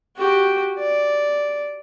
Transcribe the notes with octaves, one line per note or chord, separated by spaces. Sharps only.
F#4 G4
D5